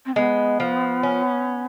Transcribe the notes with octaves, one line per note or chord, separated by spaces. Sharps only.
C4
G#3 B3
F3
C#4